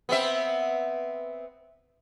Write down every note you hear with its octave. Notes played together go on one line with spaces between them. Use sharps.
B3 C4 E5